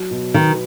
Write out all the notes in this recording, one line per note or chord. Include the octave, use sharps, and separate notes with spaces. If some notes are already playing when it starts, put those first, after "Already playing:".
Already playing: F#3
B2
D#3 B3